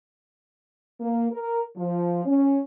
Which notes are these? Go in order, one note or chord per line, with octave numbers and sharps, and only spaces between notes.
A#3
A#4
F3
C#4